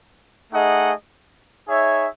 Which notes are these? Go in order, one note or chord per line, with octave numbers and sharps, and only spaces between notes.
A3 D#4 G#4 D#5 F#5
D#4 G#4 C#5 E5